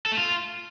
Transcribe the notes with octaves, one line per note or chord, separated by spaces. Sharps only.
A4
A3
F4